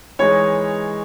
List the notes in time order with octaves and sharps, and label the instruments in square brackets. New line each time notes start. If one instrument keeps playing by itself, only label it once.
[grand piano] E3 G#3 D#4 [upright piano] C#5